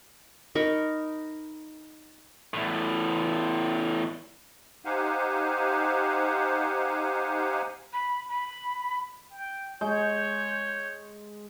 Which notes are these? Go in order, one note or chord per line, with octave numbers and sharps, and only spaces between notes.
D#4 A#4 B5 C#6
E2 A2
D#4 G4 C5 F5 F#5 G#5
B5
B5
G5
G#3 C#5 G6